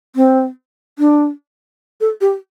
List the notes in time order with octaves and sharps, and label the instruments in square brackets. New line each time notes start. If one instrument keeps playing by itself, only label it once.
[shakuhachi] C4
D4
A4
G4